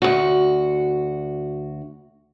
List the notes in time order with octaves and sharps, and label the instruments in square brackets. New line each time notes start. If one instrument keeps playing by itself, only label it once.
[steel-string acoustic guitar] D2 F#4